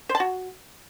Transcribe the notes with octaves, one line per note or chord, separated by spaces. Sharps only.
C5
A5
F#4